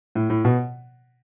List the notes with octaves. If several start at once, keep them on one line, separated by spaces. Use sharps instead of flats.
A2
A2
B2